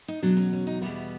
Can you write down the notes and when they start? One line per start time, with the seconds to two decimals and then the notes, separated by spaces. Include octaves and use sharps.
0.08 D#4
0.22 E2 B2 F#3 D4
0.37 C#4
0.53 C#4
0.67 D#4
0.81 E2 B2 G3 B3 E4